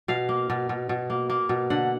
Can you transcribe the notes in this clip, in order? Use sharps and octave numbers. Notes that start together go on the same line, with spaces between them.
B2 F5
A#3
B2
B2
B2
A#3
A#3
B2
D3 F#5